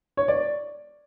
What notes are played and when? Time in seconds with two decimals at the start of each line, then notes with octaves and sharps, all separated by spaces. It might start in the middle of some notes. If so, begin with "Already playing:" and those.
0.17 C#5
0.28 D5